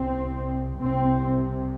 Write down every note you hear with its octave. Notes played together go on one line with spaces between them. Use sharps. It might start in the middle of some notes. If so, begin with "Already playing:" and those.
Already playing: C2 C3 C4
C2 C3 C4